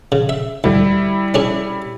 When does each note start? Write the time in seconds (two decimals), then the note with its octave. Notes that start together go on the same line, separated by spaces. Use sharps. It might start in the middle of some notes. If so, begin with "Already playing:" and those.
0.12 C#3
0.29 E5
0.64 D2 G3 E4
1.34 C#4 D4 G#4